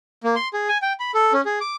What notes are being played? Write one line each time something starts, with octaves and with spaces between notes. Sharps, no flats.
A#3
C6
G#4
G#5
G5
B5
A4
C#4
G#4
D6